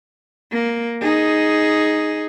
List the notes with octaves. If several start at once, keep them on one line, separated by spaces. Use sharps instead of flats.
A#3
D#4 G#4